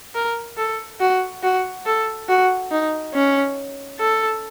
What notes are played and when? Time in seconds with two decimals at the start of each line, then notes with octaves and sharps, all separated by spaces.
0.15 A#4
0.58 A4
1.00 F#4
1.43 F#4
1.86 A4
2.28 F#4
2.72 D#4
3.14 C#4
3.99 A4